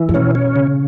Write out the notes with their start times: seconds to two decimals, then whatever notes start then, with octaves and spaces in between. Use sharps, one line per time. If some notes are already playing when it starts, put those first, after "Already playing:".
Already playing: E3
0.09 G#2
0.14 B2 C#4
0.35 C#4
0.56 C#3